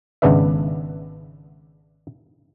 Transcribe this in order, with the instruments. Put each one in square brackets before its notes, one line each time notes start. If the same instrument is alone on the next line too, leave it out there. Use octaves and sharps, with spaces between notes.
[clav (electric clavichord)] G#1 C#3 B3 D4 B4 E5